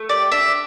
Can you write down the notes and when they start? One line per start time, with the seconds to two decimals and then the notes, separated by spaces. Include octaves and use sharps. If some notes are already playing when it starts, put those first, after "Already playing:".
Already playing: A3
0.09 G4 D5
0.32 D4 E5